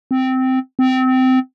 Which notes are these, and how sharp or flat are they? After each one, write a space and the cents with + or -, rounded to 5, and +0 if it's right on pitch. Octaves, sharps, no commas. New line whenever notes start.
C4 -10
C4 -20